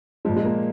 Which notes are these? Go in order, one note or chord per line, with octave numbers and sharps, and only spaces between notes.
A#2 F3 G#3
G#3
A#3